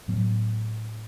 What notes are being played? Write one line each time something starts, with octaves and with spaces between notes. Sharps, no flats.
A2 F#3 B3